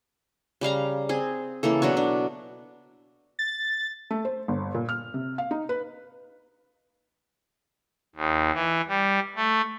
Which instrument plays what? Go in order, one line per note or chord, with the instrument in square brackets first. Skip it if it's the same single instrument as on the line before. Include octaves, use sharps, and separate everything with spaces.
[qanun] C#3 G3 F5 A#5
C4 G#4
C#3 E3 A#3 A4
B2 F#3 D4 F#4
D4
[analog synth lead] A6
[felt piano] A3
C5
G1
A#2
F6
C3
F5
D#4
B4
[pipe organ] D#2
E3
G3
A3